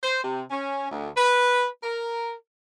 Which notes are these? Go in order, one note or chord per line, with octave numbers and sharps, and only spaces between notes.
C5
C3
C#4
D2
B4
A#4